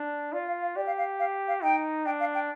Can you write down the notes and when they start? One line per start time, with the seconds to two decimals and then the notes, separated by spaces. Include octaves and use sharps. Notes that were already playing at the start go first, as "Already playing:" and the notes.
Already playing: D4
0.33 F4 D5
0.47 F5
0.62 F5
0.76 G4 D5
0.87 F5
0.98 F5
1.20 F5
1.48 F5
1.63 D#4 G5
2.06 D4 G5
2.20 F5
2.35 G5